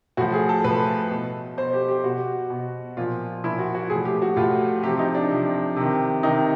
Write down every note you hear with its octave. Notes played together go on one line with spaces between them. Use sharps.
A2 F3 F#4
G#4
A4
A2 F3 B4
B2
B2 C5
G4
G4
B2 F#4
B2
A#2 F3 F4
A#2 F3 E4
F#4
F#4
A2 F3 G#4
G4
F#4
A2 F3 F4
C3 G4
F3
D#4
D4
C3 F3
C3 D#3
C3 D#3 D#4